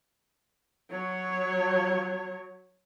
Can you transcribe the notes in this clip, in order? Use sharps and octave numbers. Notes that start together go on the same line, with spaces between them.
F#3 C#5